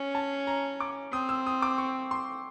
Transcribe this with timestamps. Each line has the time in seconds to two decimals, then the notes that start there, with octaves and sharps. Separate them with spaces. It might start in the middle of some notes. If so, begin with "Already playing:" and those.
Already playing: C#4
0.15 A5
0.47 A#5
0.80 D6
1.13 C4 D#6
1.29 E6
1.46 D#6
1.62 D6
1.78 C#6
2.11 C6